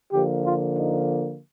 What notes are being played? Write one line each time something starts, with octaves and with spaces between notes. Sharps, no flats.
D3 F3 A#3 G4
F4
D#4